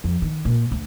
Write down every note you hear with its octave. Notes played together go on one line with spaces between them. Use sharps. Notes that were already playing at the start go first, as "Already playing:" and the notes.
F2
D#3
A#2
D2